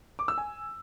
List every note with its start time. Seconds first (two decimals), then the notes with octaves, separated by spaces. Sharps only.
0.19 D6
0.28 E6
0.38 G#5